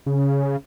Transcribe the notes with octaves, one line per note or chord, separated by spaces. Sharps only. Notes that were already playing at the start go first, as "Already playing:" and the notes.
C#3